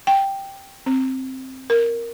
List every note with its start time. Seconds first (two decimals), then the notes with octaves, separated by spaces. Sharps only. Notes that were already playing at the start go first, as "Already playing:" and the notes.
0.07 G5
0.86 C4
1.70 A#4